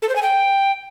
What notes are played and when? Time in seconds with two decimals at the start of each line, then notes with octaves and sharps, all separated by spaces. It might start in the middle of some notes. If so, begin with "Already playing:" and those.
0.02 A4
0.09 C5
0.16 G#5
0.23 G5